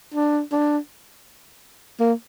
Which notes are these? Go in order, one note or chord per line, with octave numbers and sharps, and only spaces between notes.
D4
D4
A#3